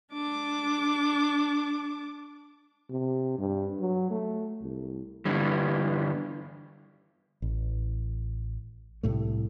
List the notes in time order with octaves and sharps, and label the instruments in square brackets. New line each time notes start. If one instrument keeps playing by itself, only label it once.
[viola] D4 D6
[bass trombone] C3
G2
F#3
A3
C2
[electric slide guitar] G2 D3 E3 G3
[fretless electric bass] A1
C2 A2 A3